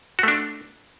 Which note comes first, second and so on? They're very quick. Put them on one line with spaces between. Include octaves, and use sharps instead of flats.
F#4 A3 D4